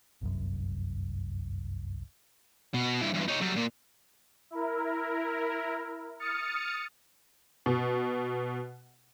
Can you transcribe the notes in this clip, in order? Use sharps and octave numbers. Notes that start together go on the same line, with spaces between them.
G1 C2 F#2
B2
G2 E4
E2 G2
D#4 C#5
F#3 G3
A#2 A#3
E4 A#4
D#6 F6 A6 C#7
B2